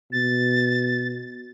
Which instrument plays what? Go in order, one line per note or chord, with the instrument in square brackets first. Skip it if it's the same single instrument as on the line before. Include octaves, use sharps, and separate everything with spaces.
[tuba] B2 [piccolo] A6